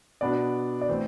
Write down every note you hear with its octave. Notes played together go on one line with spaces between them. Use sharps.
B2 B3 D4 D5
D5
E3 A3 C4 C5